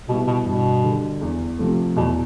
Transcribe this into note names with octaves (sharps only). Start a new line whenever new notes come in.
B2 G3 B3 E4
B2
G2 B2
D3 G3
E2
C3 F3 A3
E2 B2